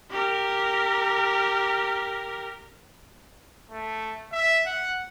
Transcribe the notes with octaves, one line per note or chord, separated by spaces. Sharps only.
G4 A#4
A3
E5
F#5